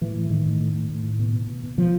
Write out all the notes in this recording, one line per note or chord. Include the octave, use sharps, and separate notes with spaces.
A2 E3
A2
A2 D#3
A2
A2
A2
A2
A2
B2
B2
B2
B2
B2 F3